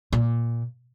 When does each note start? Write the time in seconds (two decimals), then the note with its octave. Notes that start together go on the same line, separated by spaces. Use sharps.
0.13 A#2